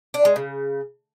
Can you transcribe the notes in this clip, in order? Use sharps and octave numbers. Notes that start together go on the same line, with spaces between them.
D4
G#3
C#3